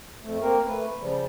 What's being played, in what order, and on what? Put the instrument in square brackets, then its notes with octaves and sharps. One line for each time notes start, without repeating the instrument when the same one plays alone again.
[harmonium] F2 A3
A#3 C4 A#4
A3 B4
C#3 F3 G3